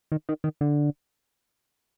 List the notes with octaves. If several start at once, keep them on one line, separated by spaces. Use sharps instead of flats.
D#3
D#3
D#3
D3